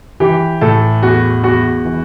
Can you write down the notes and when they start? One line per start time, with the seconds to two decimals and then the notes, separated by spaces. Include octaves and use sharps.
0.20 E3 G4
0.61 A2 A4
1.03 E2 F#4
1.43 E2 F#4
1.85 E3